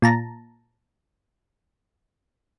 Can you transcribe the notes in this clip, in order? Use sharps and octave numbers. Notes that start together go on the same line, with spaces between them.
A#2 A5 A#5